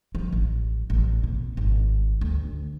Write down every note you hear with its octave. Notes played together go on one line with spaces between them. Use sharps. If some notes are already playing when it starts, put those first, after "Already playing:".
F3
A1
A1
B2
G#1
D2